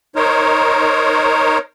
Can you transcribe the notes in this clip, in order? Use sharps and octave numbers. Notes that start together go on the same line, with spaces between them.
D#4 A#4 C5 C#5